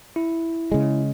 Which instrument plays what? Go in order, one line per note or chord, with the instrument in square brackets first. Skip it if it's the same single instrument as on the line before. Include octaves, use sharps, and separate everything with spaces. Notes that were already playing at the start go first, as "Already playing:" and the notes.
[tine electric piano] E4
[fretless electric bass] C#3 G#3